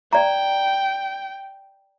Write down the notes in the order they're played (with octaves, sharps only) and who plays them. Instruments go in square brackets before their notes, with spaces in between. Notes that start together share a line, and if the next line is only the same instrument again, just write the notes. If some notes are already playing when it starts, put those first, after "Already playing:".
[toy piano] D5 A#5 [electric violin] G5